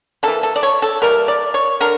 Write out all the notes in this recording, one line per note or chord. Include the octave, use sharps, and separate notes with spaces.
E3 A#3 A4
A4
D5
C#5
A4
E3 G3 A#3 A#4
D5
C#5
D3 A#4